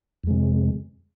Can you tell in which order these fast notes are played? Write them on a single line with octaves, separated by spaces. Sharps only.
F2 G#3 C3